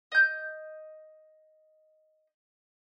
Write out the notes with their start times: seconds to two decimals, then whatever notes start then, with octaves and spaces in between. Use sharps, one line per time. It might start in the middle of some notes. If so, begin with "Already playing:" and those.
0.12 D#5 G6